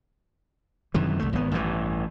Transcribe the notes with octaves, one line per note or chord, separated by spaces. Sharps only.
F#2 C3 D#3 E3
C2 A3
G#1 B3
A1 G2 D#3 E3